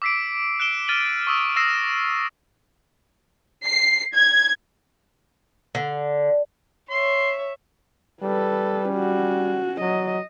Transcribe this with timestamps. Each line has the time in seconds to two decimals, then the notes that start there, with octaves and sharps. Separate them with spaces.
0.02 D6 E6 B6 C7 D7
0.60 F#6 D7 E7 G7
0.88 F6 A6 D#7 F#7
1.27 C#6 D#6 E6 F#7
1.56 D#6 E6 A#6 C7 E7
3.66 C7
4.14 G#6
5.75 D3
6.90 C#5 E5 C6
8.23 G3 A4 B4
8.90 C#4 F#4
9.81 F#3 D#5